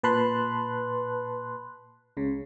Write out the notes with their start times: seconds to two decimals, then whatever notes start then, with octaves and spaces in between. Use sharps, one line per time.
0.03 A#2 B4 A5 B5 C6 F#6
2.17 C#2 C#3